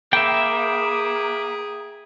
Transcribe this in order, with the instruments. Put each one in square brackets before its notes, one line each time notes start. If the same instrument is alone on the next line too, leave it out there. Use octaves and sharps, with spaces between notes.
[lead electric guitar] A#3 [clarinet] G#4 [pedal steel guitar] E5 G5 [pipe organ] B5 D6